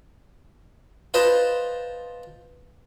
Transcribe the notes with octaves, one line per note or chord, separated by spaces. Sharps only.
F4 B4 C5 D#5 A5